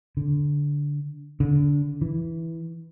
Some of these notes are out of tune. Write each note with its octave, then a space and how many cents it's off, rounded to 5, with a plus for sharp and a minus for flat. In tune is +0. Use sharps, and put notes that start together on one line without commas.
D3 -15
D3 -25
E3 -5